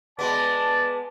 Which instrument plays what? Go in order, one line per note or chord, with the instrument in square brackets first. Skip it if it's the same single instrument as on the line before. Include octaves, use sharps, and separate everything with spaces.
[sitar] G#3 B3 [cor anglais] D5 [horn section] A5